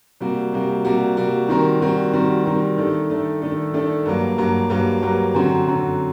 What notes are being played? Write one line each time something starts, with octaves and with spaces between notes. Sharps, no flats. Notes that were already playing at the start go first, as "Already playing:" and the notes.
C3 G3 A#3 F#4
C3 G3 A#3 F#4
C3 G3 A#3 F#4
C3 G3 A#3 F#4
D#3 G3 C4 F#4 A#4
D#3 G3 C4 F#4 A#4
D#3 G3 C4 F#4 A#4
D#3 G3 C4 F#4 A#4
D#3 A3 D4 A4
D#3 A3 D4 A4
D#3 A3 D4 A4
D#3 A3 D4 A4
G2 F#3 A#3
G2 F#3 A#3
G2 F#3 A#3
G2 F#3 A#3
F#2 D3 F#3 C4 F#4
F#2 D3 F#3 C4 F#4